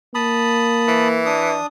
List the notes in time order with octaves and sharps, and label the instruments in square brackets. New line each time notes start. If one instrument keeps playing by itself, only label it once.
[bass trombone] A#3 [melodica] A5 B5 D#6
[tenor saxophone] E3
[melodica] D4 D#6